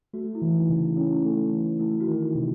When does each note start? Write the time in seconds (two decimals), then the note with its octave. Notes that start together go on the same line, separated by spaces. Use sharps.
0.13 A3 F#4
0.35 E4
0.42 E3
0.55 D#4
0.69 C#3
0.76 E4
0.96 C#4 E4
1.25 A3
1.52 E3
1.79 A3 E4
2.00 F#4
2.07 D#3
2.22 D#4
2.35 C3